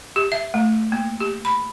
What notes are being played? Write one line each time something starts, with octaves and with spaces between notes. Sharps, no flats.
G4
E5
A3
A#3
G4
B5